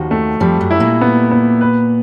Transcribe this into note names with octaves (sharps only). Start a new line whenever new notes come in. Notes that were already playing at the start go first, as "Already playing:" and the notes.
Already playing: D#2 D#3 F3 F#4
A3
F2 F3 G3
F#2 F#3
E4
A#2 A#3
B3
B3
B4